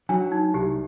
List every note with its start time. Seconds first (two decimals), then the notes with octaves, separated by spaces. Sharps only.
0.09 F#3 D4
0.32 D#4
0.54 C2 G4